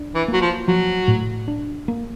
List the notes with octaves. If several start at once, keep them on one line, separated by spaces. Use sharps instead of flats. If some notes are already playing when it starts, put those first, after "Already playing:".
Already playing: D4
E3
F#3 A#3
F3
F3 F#3
A2
D4
A#3